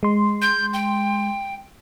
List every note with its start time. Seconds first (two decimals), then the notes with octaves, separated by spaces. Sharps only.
0.03 G#3 C6
0.42 G6
0.73 G5